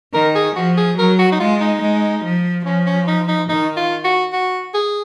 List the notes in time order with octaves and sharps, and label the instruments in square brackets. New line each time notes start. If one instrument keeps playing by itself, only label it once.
[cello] D#3 [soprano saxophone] A#4
[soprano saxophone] G#4
[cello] F3 [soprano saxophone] F#4
[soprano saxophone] G#4
[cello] F#3 [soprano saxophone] A#4
[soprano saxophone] F#4
D#4
[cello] G#3 [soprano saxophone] F4
[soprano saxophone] D#4
[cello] G#3
F3
[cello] F3 [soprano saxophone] C#4
[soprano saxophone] C#4
D#4
D#4
[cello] D#3 [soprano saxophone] D#4
[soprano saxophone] F4
F#4
F#4
G#4